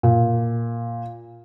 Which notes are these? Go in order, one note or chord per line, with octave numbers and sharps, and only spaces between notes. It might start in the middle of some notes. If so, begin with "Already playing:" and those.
A#2